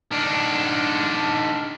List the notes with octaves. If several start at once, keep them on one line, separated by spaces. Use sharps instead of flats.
D#3 D4